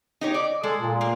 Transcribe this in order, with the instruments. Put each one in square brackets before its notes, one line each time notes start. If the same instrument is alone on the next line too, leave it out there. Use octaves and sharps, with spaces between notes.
[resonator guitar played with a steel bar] D#4 G4 C#5
D5
[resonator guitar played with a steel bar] G#3 [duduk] A4
[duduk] A#2
[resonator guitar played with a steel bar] A#3